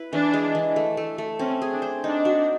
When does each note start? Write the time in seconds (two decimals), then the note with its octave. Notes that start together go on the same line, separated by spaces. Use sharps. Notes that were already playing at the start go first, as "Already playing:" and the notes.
Already playing: E4 B4
0.12 E3 D4
0.33 G#3
0.55 E3
0.76 A3
0.97 A3
1.18 A3
1.39 C4 C#4
1.62 G#4
1.72 D4
1.82 C5
2.04 D4 D#4
2.25 F#4